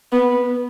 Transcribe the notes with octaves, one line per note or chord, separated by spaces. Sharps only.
B3